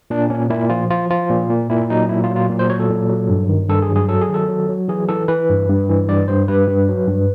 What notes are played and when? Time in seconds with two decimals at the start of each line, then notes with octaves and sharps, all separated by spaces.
0.10 A#2 D4
0.30 A#2 C#4
0.50 A#2 E4
0.70 F3 F4
0.90 F3 F4
1.10 F3 F4
1.30 A#2
1.50 A#2
1.70 A#2 E4
1.90 F#3 D#4
2.09 A#2 E4
2.24 F4
2.30 F#3
2.36 F4
2.49 A#2
2.59 C5
2.69 F#3 C#5
2.80 A4
2.90 A#2
3.09 F#3
3.29 G2
3.49 D#3
3.69 G2 A4
3.82 G#4
3.90 F#3
3.96 G#4
4.09 F#3 A4
4.21 G#4
4.29 D#3 A4
4.49 F#3
4.69 F#3
4.88 E3 G#4
5.08 E3 A4
5.28 E3 B4
5.49 G2
5.69 G2
5.89 E3
6.08 G2 D5
6.28 G2 C5
6.48 G2 B4
6.68 G2
6.88 F#3
7.08 G2